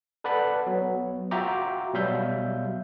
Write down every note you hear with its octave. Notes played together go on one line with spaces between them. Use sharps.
A4 B4 D5 F#5 A5 B5
F#3 B3
F4 F#4 E5 G5 A#5 D6
B2 F#3 G3 E5 F5 G6